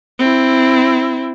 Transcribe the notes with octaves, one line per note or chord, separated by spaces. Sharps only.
C4 E4